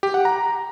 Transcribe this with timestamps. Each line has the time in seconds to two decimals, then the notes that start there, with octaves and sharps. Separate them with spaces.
0.03 G4
0.14 F#5
0.25 A#5